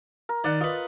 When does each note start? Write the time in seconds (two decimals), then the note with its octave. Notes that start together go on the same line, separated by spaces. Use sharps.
0.29 A#4
0.44 D#3 D5 F#5
0.61 F4 B4 D#5